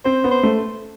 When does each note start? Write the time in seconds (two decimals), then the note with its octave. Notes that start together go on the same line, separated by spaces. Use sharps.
0.05 C4 C5
0.24 B3
0.31 C5
0.43 A3